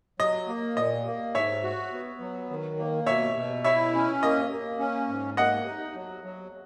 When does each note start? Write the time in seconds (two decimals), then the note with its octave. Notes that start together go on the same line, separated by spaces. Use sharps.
0.20 F#3 D#5
0.48 A#3
0.77 A#2 D#5
1.06 A#3
1.34 G#2 C#5 E5
1.63 F#4
1.92 B3
2.20 F#3
2.50 D#3
2.79 A#3
3.06 B2 C#5 E5
3.36 B2
3.64 E4 C#5 E5
3.94 C#4
4.22 A#3 D#5
4.51 A#3
4.79 C#4
5.09 G#2
5.37 A#3 D#5 F#5
5.66 D#4
5.95 F#3
6.24 F#3